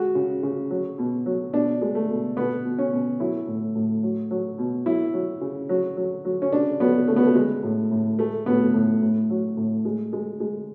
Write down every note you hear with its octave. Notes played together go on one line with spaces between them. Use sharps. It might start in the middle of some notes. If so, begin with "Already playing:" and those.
Already playing: G#3 F#4
C#3
C#3
F#3
B2
F#3
B2 D4
G#3
A3
B2
B2 B3
B2
C#4
B2
F#3 E4
A2
A2
F#3
F#3
B2
F#3 E4
F#3
C#3
F#3
F#3
F#3
C#4
C#3 D4
F#3 B3
C#3 A3
B3
A3
G#3
A2
A2
G#3 A3
A2 B3
A2
A2
F#3
A2
G#3
G#3
G#3